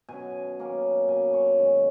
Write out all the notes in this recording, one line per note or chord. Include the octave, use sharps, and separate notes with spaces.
B2 F#3 C#4 G#5
B2 A#3 C#4
B2 A#3 C#4 G#5
C#5
F#2 D#3 G#3